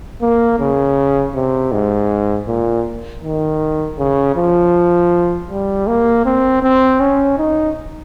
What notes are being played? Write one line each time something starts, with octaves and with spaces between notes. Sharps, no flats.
A#3
C#3
C3
G#2
A#2
D#3
C#3
F3
G3
A#3
C4
C4
C#4
D#4